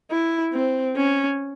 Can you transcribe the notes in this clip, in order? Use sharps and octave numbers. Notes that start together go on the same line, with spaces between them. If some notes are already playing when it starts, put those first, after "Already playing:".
E4
C4
C#4